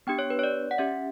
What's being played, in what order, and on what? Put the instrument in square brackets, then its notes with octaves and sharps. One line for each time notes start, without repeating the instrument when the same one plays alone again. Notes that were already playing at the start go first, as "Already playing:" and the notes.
[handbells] B3 D4 G4 G5
C#5
B4
C#5
D5
F#5
C#4 G4 E5